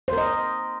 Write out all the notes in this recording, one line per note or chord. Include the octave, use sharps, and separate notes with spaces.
A#4 C5 D#5